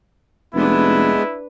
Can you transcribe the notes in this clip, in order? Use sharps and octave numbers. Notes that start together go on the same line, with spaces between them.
F1 G#3 B3 D4 E4 B4